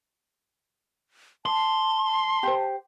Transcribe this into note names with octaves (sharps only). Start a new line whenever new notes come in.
A5 C6
G4 C5